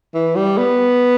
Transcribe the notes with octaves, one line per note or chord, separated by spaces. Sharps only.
E3
G3
B3